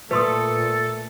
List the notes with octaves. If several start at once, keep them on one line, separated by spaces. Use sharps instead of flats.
A#2 A3 A4 B4 C6 D#6